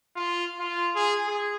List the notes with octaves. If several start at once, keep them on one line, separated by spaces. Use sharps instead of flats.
F4
F4
G#4
G#4